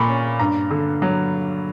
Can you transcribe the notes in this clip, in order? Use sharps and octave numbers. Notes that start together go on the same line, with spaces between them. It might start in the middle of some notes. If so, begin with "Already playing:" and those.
Already playing: A#2 A#3 B5 C#6
C#4
G2 A#5
D3
F#3